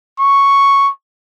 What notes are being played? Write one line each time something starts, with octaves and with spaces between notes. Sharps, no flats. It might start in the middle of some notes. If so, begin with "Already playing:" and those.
C#6